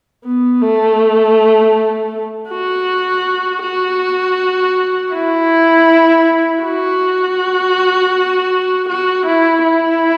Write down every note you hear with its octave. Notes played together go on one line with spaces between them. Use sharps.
B3
A3
F#4
F#4
E4
F#4
F#4
E4
E4